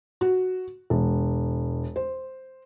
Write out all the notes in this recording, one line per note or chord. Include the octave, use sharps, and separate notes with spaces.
F#4
E1
C5